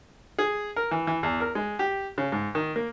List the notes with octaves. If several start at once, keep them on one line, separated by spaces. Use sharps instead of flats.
G#4
A#4
E3
E3
E2
A#4
G#3
G4
C#3
G#2
D#3
A#3